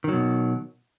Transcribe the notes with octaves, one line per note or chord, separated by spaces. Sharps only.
B2 D#3 F#3